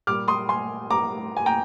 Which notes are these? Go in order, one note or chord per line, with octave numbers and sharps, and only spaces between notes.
A#2 G3 D6 F6
C6 D#6
G#5 C6
A#5 D6
G#5
G5 A#5